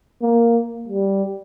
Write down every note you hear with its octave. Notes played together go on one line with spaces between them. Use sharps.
A#3
G3